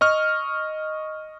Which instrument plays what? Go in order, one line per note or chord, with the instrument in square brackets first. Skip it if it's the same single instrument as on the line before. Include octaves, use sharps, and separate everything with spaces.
[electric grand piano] D#5 C#6 F6